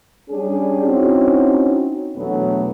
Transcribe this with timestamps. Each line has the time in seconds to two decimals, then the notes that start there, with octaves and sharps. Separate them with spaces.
0.30 G3 C#4 D4 G#4
0.83 C4 C#4 D#4 E4 F#4
2.16 E2 B2 F#3 A3 B3 D4